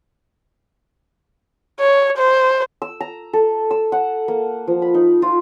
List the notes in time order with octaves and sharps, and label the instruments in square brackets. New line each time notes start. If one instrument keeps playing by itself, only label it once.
[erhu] C#5
C5
[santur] E6
A#5
A4
E6
F#5
A#3
F3
B5
D#4
F4